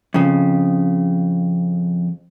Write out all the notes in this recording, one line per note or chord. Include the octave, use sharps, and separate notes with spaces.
F2 C#3